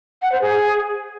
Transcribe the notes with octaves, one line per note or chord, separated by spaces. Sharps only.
F#5
C5
G#4